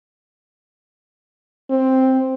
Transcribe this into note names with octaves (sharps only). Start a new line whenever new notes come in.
C4